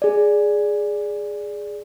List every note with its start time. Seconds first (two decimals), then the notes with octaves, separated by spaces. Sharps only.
0.02 G#4 D5